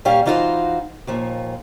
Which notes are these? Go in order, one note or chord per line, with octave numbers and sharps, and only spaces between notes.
A#2 G3 C#4 G4 F5
E3 D#4 F4 F#4 G#4 C5
D#2 A#2 F3